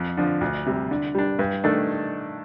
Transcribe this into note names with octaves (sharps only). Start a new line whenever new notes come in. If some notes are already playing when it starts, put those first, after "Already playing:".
Already playing: F2
D3 F3
D2
C3 G3
D3
G3 D4
G2
D#3 A3 D4 A4